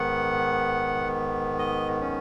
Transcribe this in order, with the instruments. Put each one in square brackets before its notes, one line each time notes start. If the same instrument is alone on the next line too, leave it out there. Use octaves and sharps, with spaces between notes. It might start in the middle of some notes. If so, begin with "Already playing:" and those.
Already playing: [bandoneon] G#2 D#3 B3 F#5
D#5
C#4